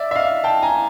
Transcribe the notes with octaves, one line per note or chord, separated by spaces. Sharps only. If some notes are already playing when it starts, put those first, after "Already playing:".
Already playing: D5 E5
E5
D#5 F5
G5 A5
G#5 A#5